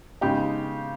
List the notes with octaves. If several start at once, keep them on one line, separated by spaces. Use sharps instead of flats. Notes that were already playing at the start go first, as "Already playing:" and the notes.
C#3 G#3 B3 D#4 G4